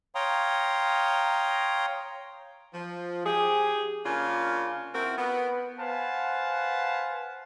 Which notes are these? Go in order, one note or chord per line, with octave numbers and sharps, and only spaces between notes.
C#5 F5 G5 A#5 C6 D#6
F3
G4 G#4
C#3 A#3 C#4 D4 F4
C4 E4 F#4 A#4
B3
B4 C5 F5 F#5 G#5 A5